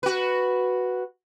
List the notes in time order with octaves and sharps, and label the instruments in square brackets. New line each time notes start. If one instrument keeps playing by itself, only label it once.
[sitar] F#4 B4